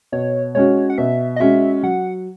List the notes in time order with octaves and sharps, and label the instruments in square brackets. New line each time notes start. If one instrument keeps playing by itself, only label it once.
[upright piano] B2 [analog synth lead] C#5
[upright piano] G#3 C#4 F#4 [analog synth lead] C#5
[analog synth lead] F#5
[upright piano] B2 [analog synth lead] E5
[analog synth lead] D#5
[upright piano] G#3 C#4 F#4 [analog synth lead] E5
[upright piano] F#3 [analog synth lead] F#5